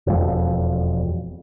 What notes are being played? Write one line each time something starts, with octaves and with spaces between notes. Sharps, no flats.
E1 F2